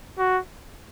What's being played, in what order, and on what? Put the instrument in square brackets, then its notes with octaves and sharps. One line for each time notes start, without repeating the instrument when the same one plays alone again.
[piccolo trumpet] F#4